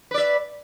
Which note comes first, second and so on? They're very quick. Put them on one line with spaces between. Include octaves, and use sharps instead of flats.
B4 D5 E5